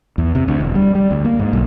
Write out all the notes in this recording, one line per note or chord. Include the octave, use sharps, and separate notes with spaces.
E2
C3
D2
E1
G3
G3
D2
A#3
G#2
B1